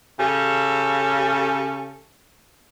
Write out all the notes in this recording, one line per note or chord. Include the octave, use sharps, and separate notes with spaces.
C#3 C#4 G4 A4